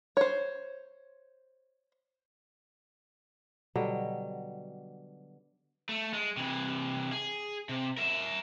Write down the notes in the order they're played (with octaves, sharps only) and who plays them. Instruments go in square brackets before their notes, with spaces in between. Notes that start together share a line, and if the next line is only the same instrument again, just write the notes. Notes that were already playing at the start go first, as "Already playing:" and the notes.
[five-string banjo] C5 C#5
[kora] B2 D3 F#3 G3
[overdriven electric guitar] A3
G#3
C3 E3
G#4
C3
A#4 E5